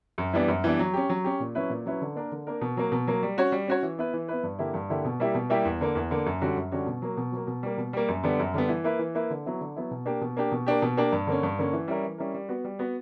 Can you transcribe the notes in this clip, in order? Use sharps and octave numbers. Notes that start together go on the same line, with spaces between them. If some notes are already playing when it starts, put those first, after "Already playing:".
F#2
E3 G3 B3 D4
F#2
E3 G3 B3 D4
F#3
C#4 G4
F#3
C#4 G4
A#2
F#3 C#4 E4 B4
A#2
F#3 C#4 E4 B4
D3
A#3 D4 A#4
D3
A#3 D4 A#4
B2
F#3 A#3
B2
F#3 A#3
G3
C#4 F#4 C#5
G3
C#4 F#4 C#5
E3
B3 E4 B4
E3
B3 E4 B4
G2
D3 A#3 E4 G4
G2
D3 A#3 E4 G4
B2
G3 A#3 E4 G4
B2
G3 A#3 E4 G4
E2
D3 A#3
E2
D3 A#3
F#2
D3 G3 C#4 F#4
F#2
D3 G3 C#4 F#4
B2
F#3 A#3
B2
F#3 A#3
B2
G3 A#3
B2
G3 A#3
F#2
D3 G3 B3
F#2
D3 G3 B3
E3
A#3 E4 B4
E3
A#3 E4 B4
D3
F#3 B3 E4
D3
F#3 B3 E4
B2
A#3 D4 G4
B2
A#3 D4 G4
B2
A#3 D4 G4
B2
A#3 D4 G4
G2
D3 A#3 C#4
G2
D3 A#3 C#4
E3
G3 C#4 E4 A#4
E3
G3 C#4 E4 A#4
G3
B3 F#4
G3
B3 F#4